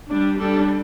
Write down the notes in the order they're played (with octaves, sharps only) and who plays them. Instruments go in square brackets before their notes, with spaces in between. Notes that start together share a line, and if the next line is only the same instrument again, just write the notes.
[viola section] G3 D4
G3 D4 A4